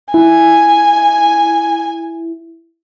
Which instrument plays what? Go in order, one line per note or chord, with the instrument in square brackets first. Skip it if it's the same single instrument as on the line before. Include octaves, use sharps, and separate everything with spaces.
[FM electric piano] E4 [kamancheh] G#5